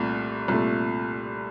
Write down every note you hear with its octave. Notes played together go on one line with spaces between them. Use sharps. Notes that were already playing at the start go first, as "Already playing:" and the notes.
Already playing: C2 A#2 A3
C2 A#2 A3